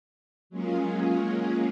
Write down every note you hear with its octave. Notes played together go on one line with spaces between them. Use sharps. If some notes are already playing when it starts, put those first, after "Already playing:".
F#3 G#3 A#3 C#4 F4 G#4